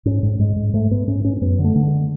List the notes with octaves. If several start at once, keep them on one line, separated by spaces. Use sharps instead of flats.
G#2 C#4
G#2
G#2 G#3
G#2
G#2 A3
G#2 B3
G#2 C#4
G#2 C#4
C#4
F#2 B3
D3
A3
D3
G#3